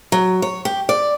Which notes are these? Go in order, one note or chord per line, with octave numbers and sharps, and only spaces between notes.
F#3
C#5
G4
D5